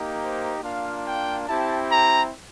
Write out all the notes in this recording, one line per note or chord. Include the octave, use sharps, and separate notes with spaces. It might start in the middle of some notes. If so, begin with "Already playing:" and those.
Already playing: A#3 D#4 G4
C5
A#3 D4 F4 F5
G5
C4 E4 G4 A5
A#5